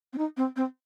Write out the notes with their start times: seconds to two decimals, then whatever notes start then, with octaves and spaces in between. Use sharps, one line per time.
0.13 C4
0.18 D#4
0.37 C4
0.56 C4